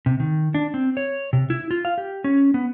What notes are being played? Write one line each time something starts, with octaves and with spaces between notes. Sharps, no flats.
C3
D#3
D4
C4
C#5
C3
E4
F4
F5
G4
C#4
B3